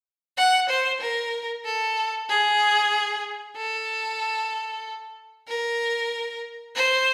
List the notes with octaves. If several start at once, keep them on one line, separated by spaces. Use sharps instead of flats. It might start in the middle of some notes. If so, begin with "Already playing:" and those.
F#5
C5
A#4
A4
G#4
A4
A#4
C5